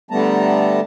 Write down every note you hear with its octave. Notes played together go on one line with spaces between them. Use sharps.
D3 G3 A3 B3 A5 A#5